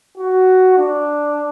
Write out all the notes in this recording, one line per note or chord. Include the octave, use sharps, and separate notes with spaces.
F#4
D4